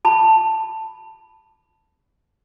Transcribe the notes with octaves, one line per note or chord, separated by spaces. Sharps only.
A5 B5